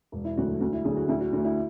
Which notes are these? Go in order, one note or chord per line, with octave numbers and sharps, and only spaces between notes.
E1
E4
D2 D3 F#3 A3 F#4
D2 F#4
E4
D3 F#3 A3 G#4
F#4
D2 E4
F#4
D3 A3 F#4
E4